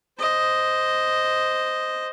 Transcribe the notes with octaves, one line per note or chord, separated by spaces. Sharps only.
C5 D#5